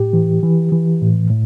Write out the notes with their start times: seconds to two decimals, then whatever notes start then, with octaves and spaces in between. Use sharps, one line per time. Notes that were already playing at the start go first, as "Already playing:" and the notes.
Already playing: A2 G4
0.13 E3
0.43 E3
0.72 E3
1.02 A2
1.30 A2